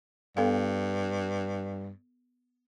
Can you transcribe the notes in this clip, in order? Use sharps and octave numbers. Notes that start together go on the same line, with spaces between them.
G2 B3 A4 F5